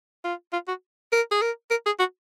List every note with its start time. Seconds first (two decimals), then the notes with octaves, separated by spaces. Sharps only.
0.25 F4
0.53 F4
0.68 F#4
1.12 A#4
1.31 G#4
1.42 A#4
1.70 A#4
1.86 G#4
1.99 F#4